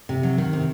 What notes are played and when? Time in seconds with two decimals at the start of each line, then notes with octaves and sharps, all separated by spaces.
0.09 C3
0.23 F#3
0.38 D#3
0.53 C3